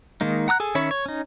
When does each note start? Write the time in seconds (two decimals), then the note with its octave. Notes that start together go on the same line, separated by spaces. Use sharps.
0.21 D#3 G#3 A#3 D#4
0.48 F#5 A#5 D#6 F#6
0.60 G#4 A4 G#5
0.75 D#3 C#4 C#5 E5 B5
0.91 C#5
1.06 C#4 D#4